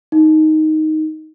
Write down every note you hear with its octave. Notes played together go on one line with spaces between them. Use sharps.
D#4